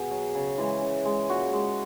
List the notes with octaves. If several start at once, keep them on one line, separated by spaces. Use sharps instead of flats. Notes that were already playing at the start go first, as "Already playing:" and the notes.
Already playing: B2 G#4
F#3
C#3
E3 G#3
C#3
G#3
A#2 F#4
G#3